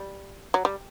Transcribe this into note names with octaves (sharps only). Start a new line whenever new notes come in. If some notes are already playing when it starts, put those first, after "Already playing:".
Already playing: G3
F#3
G3